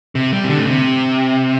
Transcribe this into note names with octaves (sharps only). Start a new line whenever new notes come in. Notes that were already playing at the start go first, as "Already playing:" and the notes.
C3
G3
C3
D3
A2
C3